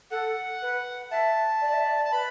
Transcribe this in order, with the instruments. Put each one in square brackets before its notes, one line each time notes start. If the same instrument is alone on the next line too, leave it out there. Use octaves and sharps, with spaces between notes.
[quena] A4 [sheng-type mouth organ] F#5
[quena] B4
[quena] E5 [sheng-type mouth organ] A5
[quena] D5
E5
D5
[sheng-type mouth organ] A5
[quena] B4 [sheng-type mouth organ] B5